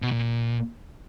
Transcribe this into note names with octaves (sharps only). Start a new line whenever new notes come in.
B2
A#2